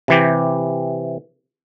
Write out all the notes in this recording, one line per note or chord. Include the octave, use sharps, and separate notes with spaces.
C3 E3 G4